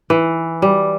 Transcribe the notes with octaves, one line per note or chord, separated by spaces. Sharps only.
E3
G3